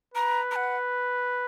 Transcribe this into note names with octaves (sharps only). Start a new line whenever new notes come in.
B4 A#5
A#5
F#5